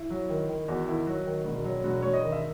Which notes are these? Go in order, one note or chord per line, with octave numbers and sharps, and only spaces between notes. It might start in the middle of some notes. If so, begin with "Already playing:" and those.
Already playing: E4
F#3
D#3
D#3
E2 F#4
D#3 E4
F#3 F#4
D#3
E1
F#3
E1 F#4
E1 C#5
D#5
D#3
E5